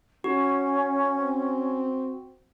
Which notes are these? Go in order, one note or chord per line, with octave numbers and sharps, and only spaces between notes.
C#4 F#4
C4